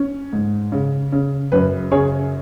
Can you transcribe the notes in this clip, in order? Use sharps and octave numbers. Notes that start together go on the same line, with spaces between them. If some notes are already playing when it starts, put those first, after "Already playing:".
Already playing: C#4
G#2
C#3
C#3
F#2 B4
C#3 G#4 C#5